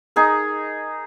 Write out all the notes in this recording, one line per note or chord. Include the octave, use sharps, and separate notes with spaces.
D#4 G#4 A#4